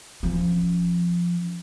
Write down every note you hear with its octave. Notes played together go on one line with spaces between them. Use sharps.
F3 C#4